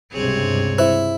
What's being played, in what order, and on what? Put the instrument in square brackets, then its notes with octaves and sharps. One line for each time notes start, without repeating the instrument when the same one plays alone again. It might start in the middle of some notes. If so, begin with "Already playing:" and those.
[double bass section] C#2 G2 C3 [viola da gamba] C4 G#4 C#5
[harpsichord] E4 [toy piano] C5